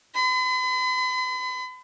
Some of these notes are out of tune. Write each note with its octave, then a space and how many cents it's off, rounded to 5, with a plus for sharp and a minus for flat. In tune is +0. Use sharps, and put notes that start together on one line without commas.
B5 +45